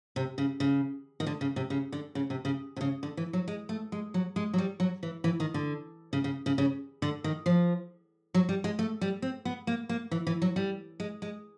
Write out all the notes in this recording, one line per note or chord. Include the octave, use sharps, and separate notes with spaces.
C3
C#3
C#3
D#3
D3
C#3
C3
C#3
D3
C#3
C3
C#3
C3
C#3
D3
E3
F#3
G#3
A3
G#3
F#3
G#3
F#3
G3
F#3
E3
E3
D#3
D3
C#3
C#3
C#3
C#3
D3
D#3
F3
F#3
G3
G#3
A3
G3
C4
B3
A#3
A#3
E3
E3
F#3
G3
G#3
G#3